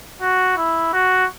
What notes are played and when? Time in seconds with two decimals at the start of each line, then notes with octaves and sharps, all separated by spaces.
0.21 F#4
0.57 E4
0.93 F#4